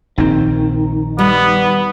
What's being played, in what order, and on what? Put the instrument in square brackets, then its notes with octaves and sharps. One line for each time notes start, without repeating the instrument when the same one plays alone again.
[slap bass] A#1 C4 [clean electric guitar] D#3
[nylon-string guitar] G3 [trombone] B3